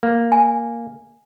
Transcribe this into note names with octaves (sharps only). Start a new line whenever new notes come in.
A#3
G#5